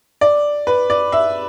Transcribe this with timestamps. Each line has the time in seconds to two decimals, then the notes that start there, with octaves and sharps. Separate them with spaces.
0.21 D5
0.67 B4
0.90 D5
1.12 E5